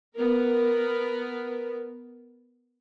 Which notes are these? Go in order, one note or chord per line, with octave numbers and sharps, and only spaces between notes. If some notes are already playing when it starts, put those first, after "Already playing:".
B3 A#4